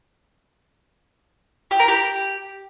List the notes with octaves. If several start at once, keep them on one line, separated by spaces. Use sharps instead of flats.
G4
A#4
G4